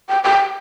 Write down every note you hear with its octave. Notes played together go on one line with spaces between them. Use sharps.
G5
G5